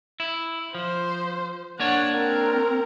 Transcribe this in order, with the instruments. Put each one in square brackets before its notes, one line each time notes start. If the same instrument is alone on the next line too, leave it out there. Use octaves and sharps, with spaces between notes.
[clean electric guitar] E4
[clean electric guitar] F3 [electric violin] C5
[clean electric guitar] A#3 D4 C#5 [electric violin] F#5
[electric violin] C4 A#4